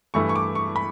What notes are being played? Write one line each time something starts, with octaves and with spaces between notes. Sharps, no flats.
G2 E3 A3 E4 C#6
C#6
D6
C#6
B5